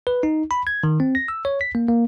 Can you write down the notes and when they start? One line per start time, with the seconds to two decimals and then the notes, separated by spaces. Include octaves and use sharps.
0.07 B4
0.23 D#4
0.51 B5
0.67 G#6
0.84 D#3
1.00 C4
1.15 A#6
1.28 E6
1.45 C#5
1.61 B6
1.75 A#3
1.89 A#3